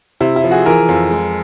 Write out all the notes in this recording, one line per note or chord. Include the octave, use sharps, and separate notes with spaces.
C3 E4
E4
F3
F#4 G#4
E3 G#4 A#4
F2
G#3